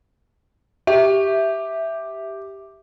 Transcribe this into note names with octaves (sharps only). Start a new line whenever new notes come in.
G4 E5